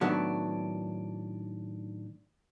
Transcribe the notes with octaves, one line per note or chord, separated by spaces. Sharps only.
A2 D#3 F#3 B3 D4